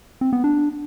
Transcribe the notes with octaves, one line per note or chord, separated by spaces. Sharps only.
C4
B3
D4